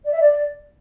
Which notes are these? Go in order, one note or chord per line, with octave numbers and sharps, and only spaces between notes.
D5
E5
D5